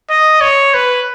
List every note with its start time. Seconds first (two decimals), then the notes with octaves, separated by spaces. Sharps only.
0.10 D#5
0.41 C#5
0.74 B4